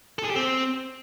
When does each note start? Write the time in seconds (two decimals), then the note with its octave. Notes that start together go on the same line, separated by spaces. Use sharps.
0.19 A4
0.24 G#4
0.30 G4
0.36 C4